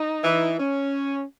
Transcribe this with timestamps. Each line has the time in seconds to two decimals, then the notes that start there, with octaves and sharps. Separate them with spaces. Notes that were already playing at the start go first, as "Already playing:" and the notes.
Already playing: D#4
0.24 E3
0.59 C#4